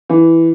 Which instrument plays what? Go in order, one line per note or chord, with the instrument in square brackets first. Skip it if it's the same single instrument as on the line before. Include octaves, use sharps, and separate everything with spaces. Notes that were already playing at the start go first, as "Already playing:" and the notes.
[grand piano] E3